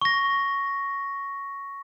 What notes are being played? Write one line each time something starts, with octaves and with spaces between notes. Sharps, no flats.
C#6 A#6